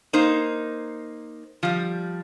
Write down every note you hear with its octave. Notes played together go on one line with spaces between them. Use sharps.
A#3 D#4 C5
F3 G3